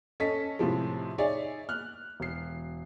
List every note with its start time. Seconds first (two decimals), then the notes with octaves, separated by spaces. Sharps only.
0.20 C#4 A4 D#5 A5 B6
0.59 A2 C3 F3 G#3
1.18 D#4 G#4 C#5 D5 E5
1.69 F6 F#6
2.20 E1 C7